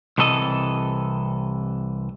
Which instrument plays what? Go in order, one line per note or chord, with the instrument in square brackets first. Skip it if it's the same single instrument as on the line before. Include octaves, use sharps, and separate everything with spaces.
[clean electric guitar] C2 C3 E3 A4 D#5